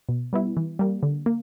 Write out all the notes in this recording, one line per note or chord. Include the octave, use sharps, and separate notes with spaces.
B2
G3 B3 E4
E3
G3 A#3
D3
A#3